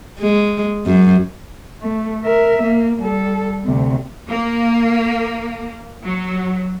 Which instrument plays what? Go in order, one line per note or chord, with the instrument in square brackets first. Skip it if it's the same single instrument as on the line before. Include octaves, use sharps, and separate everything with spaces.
[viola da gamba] G#3
F#2
[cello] A3
A#4 E5
A#3
G3 A4
D2 C3
[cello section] A#3
F#3